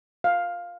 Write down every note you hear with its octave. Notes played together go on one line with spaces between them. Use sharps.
F5